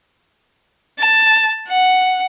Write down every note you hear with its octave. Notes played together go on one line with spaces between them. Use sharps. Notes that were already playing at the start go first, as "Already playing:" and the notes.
A5
F#5